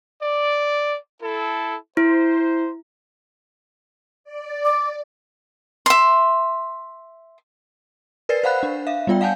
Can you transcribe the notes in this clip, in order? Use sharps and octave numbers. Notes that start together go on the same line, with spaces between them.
D5
E4 A4
E4 C5
D5
D6
E5 C6
A#4 B4 D5 A6 C7
C5 F5 F#5 B5 F#6
D4
E5 F5
G3 B3 F4 D5 G5
F5 F#5 G#5 A5 G6